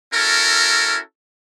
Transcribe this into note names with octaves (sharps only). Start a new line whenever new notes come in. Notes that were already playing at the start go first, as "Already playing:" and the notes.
C#4 E4 F#4 A4 A#4